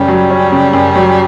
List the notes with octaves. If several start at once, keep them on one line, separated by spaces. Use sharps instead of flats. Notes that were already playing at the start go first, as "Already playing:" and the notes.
Already playing: F#2 C#3 G3 C#4
F#3
C#4
C#3
F#2
F#3